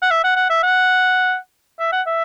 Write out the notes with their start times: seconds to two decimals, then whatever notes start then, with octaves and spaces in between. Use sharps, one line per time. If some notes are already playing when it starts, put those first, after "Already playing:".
0.02 F#5
0.11 E5
0.24 F#5
0.36 F#5
0.50 E5
0.63 F#5
1.79 E5
1.92 F#5
2.07 E5